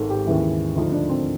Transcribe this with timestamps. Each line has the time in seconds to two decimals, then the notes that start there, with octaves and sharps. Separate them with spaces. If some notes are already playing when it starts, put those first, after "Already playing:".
Already playing: G#1 G#2 D#3 A4 A#4
0.10 G4
0.26 D#2 C#3 E3 E4
0.76 D2 D3 F3 D#4
0.92 D4
1.09 C4